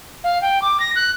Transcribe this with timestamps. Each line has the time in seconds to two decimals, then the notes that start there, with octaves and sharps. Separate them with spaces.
0.24 F5
0.42 G5
0.62 D6
0.80 A#6
0.96 F#6